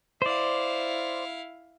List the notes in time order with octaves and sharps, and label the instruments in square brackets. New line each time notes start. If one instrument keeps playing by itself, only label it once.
[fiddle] E4 F5 [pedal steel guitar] C5 D5